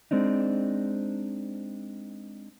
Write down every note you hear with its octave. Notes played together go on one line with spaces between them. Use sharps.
G#3 C4 D4 D#4